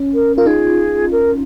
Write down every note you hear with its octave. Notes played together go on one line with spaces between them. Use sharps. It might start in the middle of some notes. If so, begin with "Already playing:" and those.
Already playing: C#4
A#4
F4 A#4
D#4 G#4
A#4